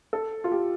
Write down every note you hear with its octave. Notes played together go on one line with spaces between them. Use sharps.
A4
F4
G4